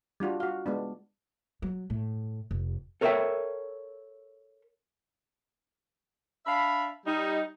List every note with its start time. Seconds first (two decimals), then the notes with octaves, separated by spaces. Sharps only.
0.20 G3 D4 F4 F#4
0.40 F#4 F5
0.66 G#3 B3 D4
1.62 F#3
1.90 A2
2.51 F1
3.01 A4 A#4 C#5 D#5 E5 G5
6.46 D4 E5 F5 B5
7.06 G3 D#4